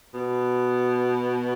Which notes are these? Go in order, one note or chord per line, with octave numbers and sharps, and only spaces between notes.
B2